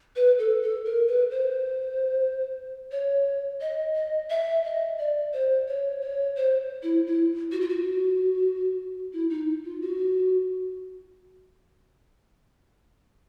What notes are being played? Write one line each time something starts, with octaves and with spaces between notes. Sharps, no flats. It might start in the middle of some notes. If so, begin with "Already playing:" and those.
B4
A4
A4
A#4
B4
C5
C#5
D#5
D#5
E5
D#5
D5
C5
C#5
C#5
C5
E4
E4
F#4
F4
F#4
E4
D#4
F4
F#4